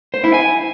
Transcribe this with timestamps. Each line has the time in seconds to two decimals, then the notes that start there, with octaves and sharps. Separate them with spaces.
0.14 C5
0.24 E4
0.34 G#5